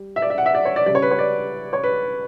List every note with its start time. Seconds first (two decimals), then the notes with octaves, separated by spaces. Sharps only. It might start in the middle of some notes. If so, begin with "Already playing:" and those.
Already playing: G3
0.16 E5
0.22 D5
0.30 E5
0.38 F#5
0.46 E5
0.55 D5
0.65 C#5
0.76 D5
0.86 C#3 G3 D5
0.95 C#5
1.02 B4
1.11 C#5
1.19 D5
1.73 C#5
1.84 B4